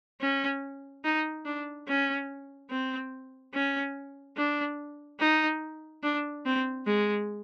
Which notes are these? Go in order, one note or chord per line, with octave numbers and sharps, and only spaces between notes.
C#4
D#4
D4
C#4
C4
C#4
D4
D#4
D4
C4
G#3